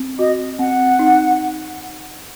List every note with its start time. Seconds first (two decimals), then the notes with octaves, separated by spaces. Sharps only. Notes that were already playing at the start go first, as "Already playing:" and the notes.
Already playing: C4
0.19 F#4 D#5
0.59 C4 F#5
0.99 D#4